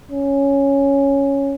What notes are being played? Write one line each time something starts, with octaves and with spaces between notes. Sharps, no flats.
C#4